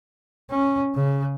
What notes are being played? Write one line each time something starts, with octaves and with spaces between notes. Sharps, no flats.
C#4
C#3